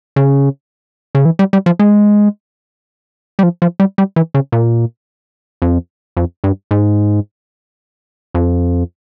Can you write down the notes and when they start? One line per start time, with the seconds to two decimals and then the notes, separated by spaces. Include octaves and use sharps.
0.16 C#3
1.15 C#3
1.25 E3
1.39 G3
1.53 G3
1.66 F3
1.79 G#3
3.39 G3
3.43 F3
3.62 F3
3.80 G3
3.98 G3
4.16 E3
4.34 C#3
4.52 A#2
5.62 F2
6.17 F2
6.44 G2
6.71 G#2
8.35 F2